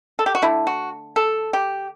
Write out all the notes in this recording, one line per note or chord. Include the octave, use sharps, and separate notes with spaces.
A4
G4
F#4
D3 A3 E4
F#4
A4
G4